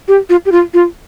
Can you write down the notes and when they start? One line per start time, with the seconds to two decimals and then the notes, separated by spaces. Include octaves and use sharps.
0.08 G4
0.30 F4
0.46 G4
0.52 F4
0.74 F4